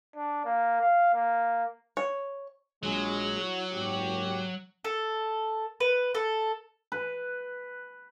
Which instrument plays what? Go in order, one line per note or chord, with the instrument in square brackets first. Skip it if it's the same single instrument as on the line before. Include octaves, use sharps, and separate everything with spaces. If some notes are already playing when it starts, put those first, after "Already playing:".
[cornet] D4
A#3
F5
A#3
[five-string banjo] C#5
[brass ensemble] A#1 G#3 [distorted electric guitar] F#3
[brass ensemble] E4 F#4
F#1 G#2 G4
[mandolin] A4
B4
A4
[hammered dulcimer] B4